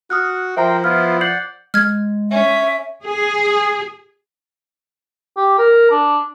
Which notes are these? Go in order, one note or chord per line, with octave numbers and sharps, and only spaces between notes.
F#4 D#6 F6 F#6
F3 A#4 C5 E5 G5 A#5
B3 E4 F4 F6
D5 F#5 G6 C7 F#7
G#3 F6 G#6
C#4 E5
G#4
G4
A#4
D4